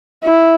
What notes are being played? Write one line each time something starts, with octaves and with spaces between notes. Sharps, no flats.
E4